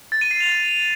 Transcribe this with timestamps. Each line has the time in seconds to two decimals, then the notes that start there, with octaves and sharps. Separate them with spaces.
0.12 A6
0.21 D#7
0.31 C7
0.40 F7